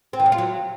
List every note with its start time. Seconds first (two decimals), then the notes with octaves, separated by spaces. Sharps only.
0.13 C4
0.20 E3
0.26 C#3
0.32 F4
0.38 F#3